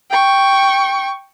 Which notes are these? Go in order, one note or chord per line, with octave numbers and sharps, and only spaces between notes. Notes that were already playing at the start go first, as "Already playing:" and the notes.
G5 C#6